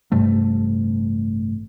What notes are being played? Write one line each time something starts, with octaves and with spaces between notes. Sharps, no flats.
A1 G2 C3 A3